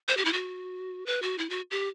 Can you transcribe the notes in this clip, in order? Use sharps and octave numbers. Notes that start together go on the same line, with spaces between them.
C5
G4
E4
F#4
B4
F#4
E4
F#4
G4